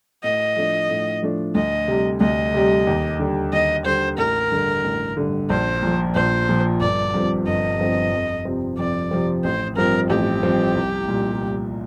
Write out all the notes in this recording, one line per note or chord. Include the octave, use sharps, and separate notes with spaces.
A2 D#5
F3 A3 D4
A2
F3 A3 D4
D2 D#5
C3 G3
D2 D#5
C3 G3
D#2
D3 G3
D#2 D#5
D3 G3 C5
A1 A#4
G2 D3
A1
G2 D3
A#1 C5
A#2 F3
A#1 C5
A#2 F3
G1 D5
G2 F3 C4
G1 D#5
G2 F3 C4
F2
C3 F3 C4
F2 D5
C3 F3 C4
A1 C5
G2 F3 C4 A#4
A1 G4
G2 F3 C4
C2
A#2 G3
C2